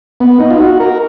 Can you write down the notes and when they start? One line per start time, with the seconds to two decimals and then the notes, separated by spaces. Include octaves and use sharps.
0.20 B3
0.40 D#4
0.50 F4
0.60 F#4
0.80 A#4